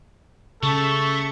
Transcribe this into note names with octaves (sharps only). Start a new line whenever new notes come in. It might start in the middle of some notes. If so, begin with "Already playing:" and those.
C#3 A3 A4 C#6